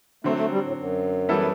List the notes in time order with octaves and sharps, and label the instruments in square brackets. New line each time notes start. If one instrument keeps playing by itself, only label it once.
[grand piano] D3 F#3 C4 [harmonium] A3
[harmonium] A3
G3
A2
F#2
[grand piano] E3 G3 B3 E4 A4